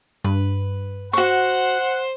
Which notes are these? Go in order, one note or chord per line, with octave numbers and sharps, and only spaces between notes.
G2 B4
F#4 C5 F#5 C#6